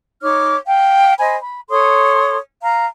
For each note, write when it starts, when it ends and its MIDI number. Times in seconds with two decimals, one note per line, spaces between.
0.21 0.55 63
0.21 0.55 73
0.21 0.55 86
0.21 0.55 89
0.66 1.13 77
0.66 1.13 79
1.19 1.36 72
1.19 1.36 75
1.19 1.36 80
1.19 1.36 83
1.41 1.61 83
1.70 2.37 69
1.70 2.37 73
1.70 2.37 84
1.70 2.37 87
2.62 2.85 77
2.62 2.85 82